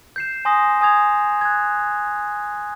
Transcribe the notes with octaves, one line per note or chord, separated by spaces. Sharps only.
G6 C7 E7
G#5 C6 D#6 A#6
G#5 D#6 G#6 F7
F#6 G#6